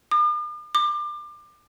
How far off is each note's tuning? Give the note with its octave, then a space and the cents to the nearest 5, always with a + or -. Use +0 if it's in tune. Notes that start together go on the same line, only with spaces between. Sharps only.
D6 +45
D6 +30